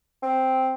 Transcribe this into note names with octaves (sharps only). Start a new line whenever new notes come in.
C4